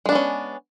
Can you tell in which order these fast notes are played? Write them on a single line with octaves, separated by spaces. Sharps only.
G#3 D4 B3 C#4